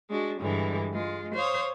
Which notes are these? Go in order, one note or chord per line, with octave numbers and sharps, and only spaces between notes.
G#3 D4 F#4
G2 D3 E3 G#3
G#3 F4
C5 C#5 F5 D#6